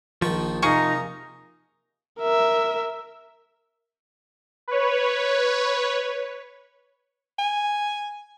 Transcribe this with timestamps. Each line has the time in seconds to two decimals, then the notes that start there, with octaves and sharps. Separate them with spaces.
0.22 A#1 D#3 F3 C#6
0.62 C3 A#3 D#4 G#4 A#4 C#6
2.21 A#4 E5
4.68 B4 C#5
7.39 G#5